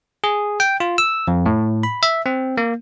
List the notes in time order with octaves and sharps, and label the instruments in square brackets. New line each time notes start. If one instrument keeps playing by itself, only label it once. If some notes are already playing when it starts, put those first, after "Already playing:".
[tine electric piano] G#4
G5
F4
E6
F2
A2
B5
E5
C4
A#3